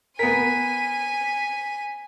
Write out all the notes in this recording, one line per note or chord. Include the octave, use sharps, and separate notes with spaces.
B3 A#4 G#5 B6 D#7